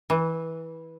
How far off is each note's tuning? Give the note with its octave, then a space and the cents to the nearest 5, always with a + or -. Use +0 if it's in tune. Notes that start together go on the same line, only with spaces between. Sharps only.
E3 -15